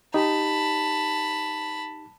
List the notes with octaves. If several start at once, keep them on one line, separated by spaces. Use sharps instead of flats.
D#4 G4 A5 B5